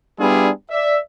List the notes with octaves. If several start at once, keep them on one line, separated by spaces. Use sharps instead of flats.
G3 B3 D4 E4 F4 G#4
D5 E5